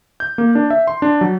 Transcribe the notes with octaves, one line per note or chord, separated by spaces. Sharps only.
G6
A#3
D4
E5
C6
D4
F#3